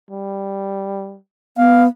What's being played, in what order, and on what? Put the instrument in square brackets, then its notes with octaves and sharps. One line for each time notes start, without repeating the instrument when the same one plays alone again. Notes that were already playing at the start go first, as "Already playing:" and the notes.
[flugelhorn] G3
[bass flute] B3 [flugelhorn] F5